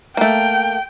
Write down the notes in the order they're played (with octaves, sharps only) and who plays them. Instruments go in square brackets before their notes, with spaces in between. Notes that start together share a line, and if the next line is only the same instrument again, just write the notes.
[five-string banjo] A3 A#3 [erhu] G5